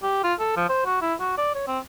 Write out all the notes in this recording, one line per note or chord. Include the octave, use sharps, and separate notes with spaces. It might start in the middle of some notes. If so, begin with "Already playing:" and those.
G4
F4
A4
F3
C5
F#4
E4
F#4
D5
C#5
C4